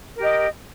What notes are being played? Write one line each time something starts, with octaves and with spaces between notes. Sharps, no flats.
G4 A#4 D#5